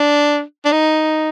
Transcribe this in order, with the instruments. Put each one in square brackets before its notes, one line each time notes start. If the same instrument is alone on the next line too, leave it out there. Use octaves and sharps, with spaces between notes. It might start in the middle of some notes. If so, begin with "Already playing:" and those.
Already playing: [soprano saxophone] D4
D4
D#4